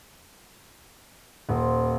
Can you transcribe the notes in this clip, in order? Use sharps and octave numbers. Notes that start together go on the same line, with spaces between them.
D#1 F4 C5